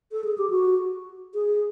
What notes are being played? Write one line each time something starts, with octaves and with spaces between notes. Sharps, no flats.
A4
G#4
G4
F#4
G#4